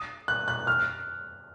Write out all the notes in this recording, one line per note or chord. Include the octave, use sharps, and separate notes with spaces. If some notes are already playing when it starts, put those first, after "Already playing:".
Already playing: D#6
F#6
F#6
F6